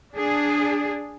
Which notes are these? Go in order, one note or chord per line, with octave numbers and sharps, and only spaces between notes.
D4 G#4